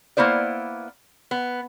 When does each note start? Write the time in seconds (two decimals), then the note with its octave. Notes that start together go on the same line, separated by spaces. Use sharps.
0.17 A#3 B3 E4 C5 D5
1.31 B3